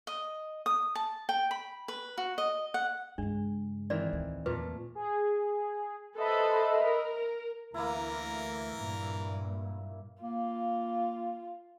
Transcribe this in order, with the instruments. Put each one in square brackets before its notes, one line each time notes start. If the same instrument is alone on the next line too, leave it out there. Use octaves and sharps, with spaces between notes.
[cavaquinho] D#5
D#6
A5
G5
B5
B4
F#4
D#5
F#5
[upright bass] G2 C#3 [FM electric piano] G#3 [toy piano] D4
[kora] D#3 E3 C4 [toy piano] D5
[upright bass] D2 A2
[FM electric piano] E2 [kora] A#2 A3 [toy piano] B4
[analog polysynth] G#4
[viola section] A4 B4 C5 [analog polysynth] D#5 E5 B5
[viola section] A#4
[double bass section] D2 [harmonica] E3 A#4 A#5 [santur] A#3 E4
[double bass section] G2 A#2
[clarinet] A#3 [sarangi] F4